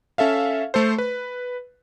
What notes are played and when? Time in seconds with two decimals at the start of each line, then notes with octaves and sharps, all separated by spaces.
0.18 C#4 A4 E5 F5
0.74 A3 A4 C5
0.98 B4